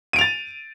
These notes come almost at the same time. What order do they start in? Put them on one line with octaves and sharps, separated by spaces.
D#7 D7 F7 A6